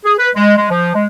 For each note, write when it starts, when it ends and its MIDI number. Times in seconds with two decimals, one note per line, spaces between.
0.05 0.13 68
0.19 0.29 71
0.35 0.54 56
0.57 0.69 56
0.71 0.92 53
0.95 1.06 56